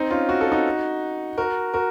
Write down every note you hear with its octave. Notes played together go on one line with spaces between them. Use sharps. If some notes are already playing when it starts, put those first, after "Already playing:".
Already playing: C4 D#4
C#4 F4
F#4
A4
D#4 F#4
F#4 A#4
F#4 A#4